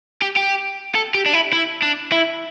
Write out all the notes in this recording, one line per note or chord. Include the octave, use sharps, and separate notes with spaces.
G4
G4
A4
G4
D4
E4
E4
D4
E4